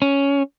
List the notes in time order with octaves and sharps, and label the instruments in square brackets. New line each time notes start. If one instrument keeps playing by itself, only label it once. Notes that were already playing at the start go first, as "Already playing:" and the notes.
[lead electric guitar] C#4